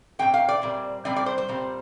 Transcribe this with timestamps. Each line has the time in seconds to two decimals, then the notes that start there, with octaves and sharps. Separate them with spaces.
0.19 A#2 G#3 C4 G5
0.34 F5
0.49 D5
0.62 A#2 G3 C4
1.05 A#2 G3 C4 D5
1.16 D5
1.26 C5
1.38 C5
1.48 A#2 G3 C4